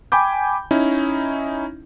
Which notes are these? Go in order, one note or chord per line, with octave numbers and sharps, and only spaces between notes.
G5 G#5 B5 D6 G6
C#4 D#4 E4